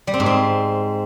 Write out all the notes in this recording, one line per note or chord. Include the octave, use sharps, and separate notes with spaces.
G3
C4
G#2
C4